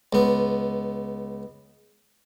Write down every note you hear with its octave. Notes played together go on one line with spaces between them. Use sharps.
C#2 B3